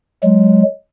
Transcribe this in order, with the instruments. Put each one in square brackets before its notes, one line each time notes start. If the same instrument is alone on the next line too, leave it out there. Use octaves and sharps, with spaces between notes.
[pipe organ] F#3 G#3